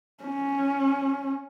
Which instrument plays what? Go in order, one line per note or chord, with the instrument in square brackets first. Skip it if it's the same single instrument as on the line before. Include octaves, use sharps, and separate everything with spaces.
[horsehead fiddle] C#4